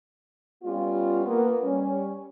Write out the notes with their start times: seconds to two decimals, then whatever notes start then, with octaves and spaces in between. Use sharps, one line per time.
0.64 G3 B3 C#4 F4
1.26 A#3 B3
1.63 G3 C#4